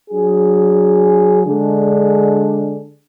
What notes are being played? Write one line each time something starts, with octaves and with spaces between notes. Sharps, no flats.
F#3 D4 G#4
D3 G#3 D4 G#4